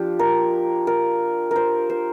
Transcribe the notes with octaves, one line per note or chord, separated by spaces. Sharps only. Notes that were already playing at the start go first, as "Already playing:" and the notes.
Already playing: F3 D4 F4 G4
A#4
A#4
A#4 C5
C5